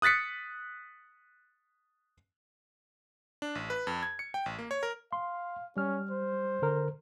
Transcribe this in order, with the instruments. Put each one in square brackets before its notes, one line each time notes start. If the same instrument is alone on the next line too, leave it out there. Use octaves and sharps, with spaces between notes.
[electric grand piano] D#6 F#6 A6 B6 C#7
D4
A1
B4
F2
G#6
C#7
G5
A1
A#3
C#5
A#4
[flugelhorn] F5 [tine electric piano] C6
[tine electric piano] G3 F6 [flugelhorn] C#4
[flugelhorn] C5
[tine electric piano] D3 A#4